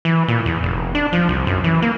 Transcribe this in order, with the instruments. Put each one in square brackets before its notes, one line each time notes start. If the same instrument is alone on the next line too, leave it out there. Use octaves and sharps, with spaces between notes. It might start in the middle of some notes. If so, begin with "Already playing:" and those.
[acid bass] E3
A#2
E2
F1
D4
F3
C2
F#2
E3
A#3